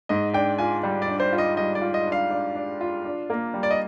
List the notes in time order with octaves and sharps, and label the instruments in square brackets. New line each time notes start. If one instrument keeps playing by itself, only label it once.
[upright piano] G#2 [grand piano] D#5
[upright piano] D4 [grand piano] G5
[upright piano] F4 [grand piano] G#5
[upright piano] G3
[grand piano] D5
[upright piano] D4
[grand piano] C5
[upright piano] F4
[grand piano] D#5
[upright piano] G3 [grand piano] D#5
[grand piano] D5
[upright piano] F4
[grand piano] D#5
[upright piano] D4
[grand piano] F5
[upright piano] D4
D4
F4
D4
A#3
G3
[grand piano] D5
D#5